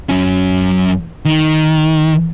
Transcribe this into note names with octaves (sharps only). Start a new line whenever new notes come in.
F#2 C#4
D#3